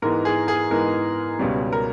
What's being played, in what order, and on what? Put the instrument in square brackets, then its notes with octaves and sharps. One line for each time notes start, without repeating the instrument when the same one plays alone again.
[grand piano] G#2 E3 G#3 B3 A#4
G#4
G#4
G#2 E3 G#3 B3 A#4
C#2 B2 G3 C#4
A#4